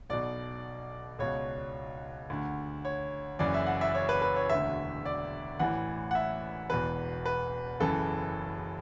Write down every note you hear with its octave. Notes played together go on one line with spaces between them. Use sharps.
B1 B2 D5
C#2 B2 C#5
D2 D3
C#5
F#1 F#2 E3 D5
E5
F#5
E5
C#5
B4
B4
C#5
E1 D2 D3 E5
D5
A1 A2 E3 F#5
F#5
E5
E1 E2 B2 B4
B4
F#1 F#2 C#3 E3 A4